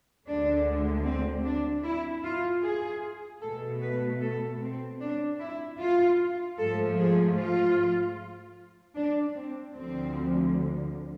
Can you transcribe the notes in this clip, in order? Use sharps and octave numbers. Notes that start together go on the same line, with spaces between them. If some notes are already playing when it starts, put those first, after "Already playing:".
D2 D3 G#3 D4
C4
D4
E4
F4
G#4
B2 A3 A4
B4
A4
C4
D4
E4
F4
G#2 F3 A3 A4
G#4
F4
D4
C4
D2 D3 F3 C4